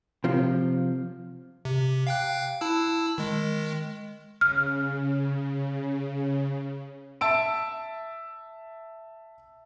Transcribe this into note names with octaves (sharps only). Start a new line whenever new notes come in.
C3 F3
C3
F5 G5 F#6
E4 A5 E6
D#3 G#3
C#3 F6
E5 A5 E6 D7